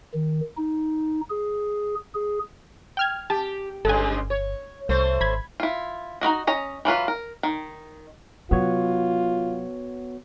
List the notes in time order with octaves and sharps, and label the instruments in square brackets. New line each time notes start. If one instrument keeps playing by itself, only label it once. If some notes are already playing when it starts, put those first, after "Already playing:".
[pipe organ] D#3
D#4
G#4
G#4
[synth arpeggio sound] G5 F6 G#6
[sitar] G4 [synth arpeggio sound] A5
[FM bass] G1 [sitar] G2 C#3 G#3 [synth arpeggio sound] A4 G#5
[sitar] C#5
[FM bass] C2 [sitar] A3 C5
[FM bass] G#1 [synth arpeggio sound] B5 G#6
[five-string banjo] E4 F4
D#4 E4 F#4 D#5
C#4 D#5 A#5
E3 F#3 F4 B4
A#4
D#3
[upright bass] C3 F#3 [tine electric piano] B3 F#4 C#5 [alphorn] F4